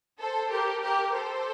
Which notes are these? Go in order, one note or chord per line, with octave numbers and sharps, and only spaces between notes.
A4 C5
G4 A#4
G4 A#4
A4 C5